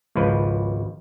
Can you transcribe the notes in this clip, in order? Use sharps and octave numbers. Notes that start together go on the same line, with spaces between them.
G#1 C#2 F3 B4